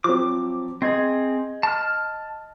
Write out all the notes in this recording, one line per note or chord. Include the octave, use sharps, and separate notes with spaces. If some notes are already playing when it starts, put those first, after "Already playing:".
F3 F#3 C4 D6
C4 G#4 D#5 G#6
A5 F6